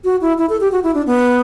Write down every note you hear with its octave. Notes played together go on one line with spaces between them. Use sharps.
F#4
E4
E4
A4
G4
F#4
E4
D4
B3